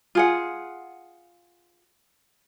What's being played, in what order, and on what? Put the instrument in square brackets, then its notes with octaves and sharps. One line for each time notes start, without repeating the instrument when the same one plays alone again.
[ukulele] F4 G#4 F#5